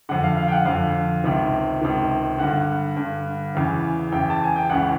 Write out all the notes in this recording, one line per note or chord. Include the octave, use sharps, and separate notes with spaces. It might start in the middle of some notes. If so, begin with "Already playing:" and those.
F2 D3 F#5
F5
F5
G5
F#5
F2 D3 F5
C#2 C3 D#3
C#2 C3 D#3
G2 D3 F#5
G2 D3
E2 C#3 E3
E2 C#3 E3 G5
A5
G#5
G5
C#2 C#3 E3 F#5